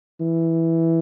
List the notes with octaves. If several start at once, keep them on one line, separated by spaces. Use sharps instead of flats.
E3